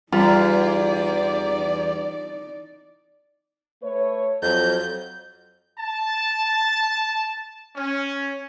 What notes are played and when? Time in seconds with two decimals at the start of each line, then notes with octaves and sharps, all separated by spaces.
0.12 E2 G3 D#4 F4 D5
3.83 A3 B4 C#5
4.42 F2 F#3 G6
5.80 A5
7.76 C#4